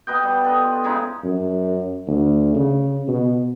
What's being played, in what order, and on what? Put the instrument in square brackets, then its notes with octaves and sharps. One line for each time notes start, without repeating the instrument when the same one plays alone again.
[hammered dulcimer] B2 B4 D#5 G5
G3
A4 B4 D#5
F4
C#3 G#3 D#4 E4
[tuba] F#2
D2
C#3
B2